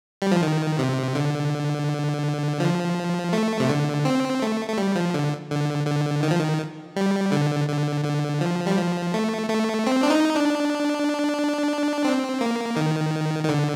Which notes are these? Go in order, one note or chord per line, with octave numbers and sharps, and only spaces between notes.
G3
F3
D#3
C3
D3
F3
A3
C3
D3
C4
A3
A3
G3
F3
D3
D3
D3
D#3
F3
D#3
G3
D3
D3
D3
F3
G3
F3
A3
A3
C4
D4
D#4
D4
C4
A#3
D#3
D#3
D3